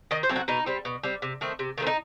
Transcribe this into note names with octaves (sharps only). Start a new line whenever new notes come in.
D#3 D#5
C5
F#3 A3 C4
F#4
B2 D#4
G3 C4
B2
G3 C4
C3
D#3 A3 C4
C3
D#3 A3 C4
D#4